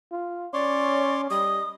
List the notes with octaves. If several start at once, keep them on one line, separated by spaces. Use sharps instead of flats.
F4
C#4 C#5 D5 C6 D6
G3 D#5 D#6